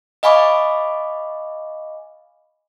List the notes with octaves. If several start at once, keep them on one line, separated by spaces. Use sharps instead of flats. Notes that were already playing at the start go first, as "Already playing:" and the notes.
D#5 F5 G#5 B5 C#6 D6